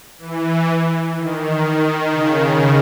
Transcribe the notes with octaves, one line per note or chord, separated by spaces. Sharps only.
E3
D#3
D#3
C#3